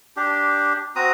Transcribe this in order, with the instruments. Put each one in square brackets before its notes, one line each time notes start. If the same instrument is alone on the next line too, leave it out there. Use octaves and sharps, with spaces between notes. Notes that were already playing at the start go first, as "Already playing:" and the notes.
[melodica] D4 G4
C4 F#4 A#5 D#6